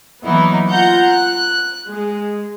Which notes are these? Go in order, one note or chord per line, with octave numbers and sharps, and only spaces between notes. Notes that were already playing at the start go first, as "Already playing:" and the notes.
E3 F#3 A#3 B3 D#4 E4
F4 F#5 A#5 G6
F#6
G#3